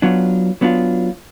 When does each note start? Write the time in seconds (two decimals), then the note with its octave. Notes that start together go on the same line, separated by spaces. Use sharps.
0.02 F#3 B3 D4 F4
0.61 F#3 B3 D4 F4